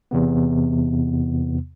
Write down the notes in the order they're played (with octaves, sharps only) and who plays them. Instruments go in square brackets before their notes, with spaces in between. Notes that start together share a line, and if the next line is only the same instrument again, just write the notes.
[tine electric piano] E2 C3 B3